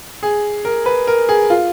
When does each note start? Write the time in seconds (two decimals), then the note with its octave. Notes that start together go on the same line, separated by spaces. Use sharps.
0.23 G#4
0.65 A#4
0.86 B4
1.07 A#4
1.29 G#4
1.50 F4